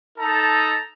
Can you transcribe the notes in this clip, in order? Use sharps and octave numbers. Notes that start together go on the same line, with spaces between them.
D#4 A4 A5 A#5